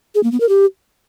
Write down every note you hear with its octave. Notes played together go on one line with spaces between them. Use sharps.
G#4
A#3
B3
A#4
G4